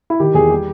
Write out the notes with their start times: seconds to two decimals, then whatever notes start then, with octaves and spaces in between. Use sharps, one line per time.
0.10 E4
0.20 D#3 G4
0.34 E2 G#4
0.50 G3 G4